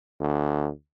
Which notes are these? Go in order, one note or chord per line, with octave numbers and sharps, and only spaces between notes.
D2